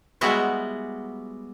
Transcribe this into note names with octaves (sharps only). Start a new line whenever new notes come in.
G3 G#3 B3 E4 F#4 C#5